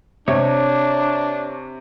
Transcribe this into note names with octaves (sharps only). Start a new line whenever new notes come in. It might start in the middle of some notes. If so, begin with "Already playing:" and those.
C3 D4 G4 C#5